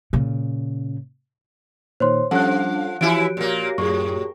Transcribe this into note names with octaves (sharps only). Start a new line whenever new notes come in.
A#2 C#3
A#2 D#3 C5 C#5 C6
F3 G3 C#4 D4 A4 F#5 F#6
E3 F3 E4 F#4 G4 C#5 D7
A#2 A#3
F#2 A2 G#4 C#6